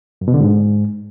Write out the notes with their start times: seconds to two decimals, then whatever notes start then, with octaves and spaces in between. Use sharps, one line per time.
0.21 F#2
0.28 B2
0.34 D3
0.40 G#2